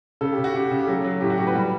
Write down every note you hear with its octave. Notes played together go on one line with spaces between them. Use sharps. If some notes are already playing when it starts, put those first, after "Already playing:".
C#3 A4
G4
C#3
F#4
C#3 G4
C#3
G4
F#3 A4
F#3
A2 G4
F#4
F#3 G4
B4
G3 F#4